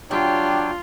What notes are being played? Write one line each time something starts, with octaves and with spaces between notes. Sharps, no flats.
F#3 D4 F4 G4 C#5 G5